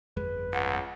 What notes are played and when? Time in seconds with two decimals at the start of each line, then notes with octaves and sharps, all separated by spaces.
0.17 G1 F2 G#3 B4
0.53 C#2 F#5